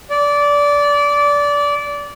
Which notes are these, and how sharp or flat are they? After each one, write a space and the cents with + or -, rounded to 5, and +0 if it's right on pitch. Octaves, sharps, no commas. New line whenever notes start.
D5 -20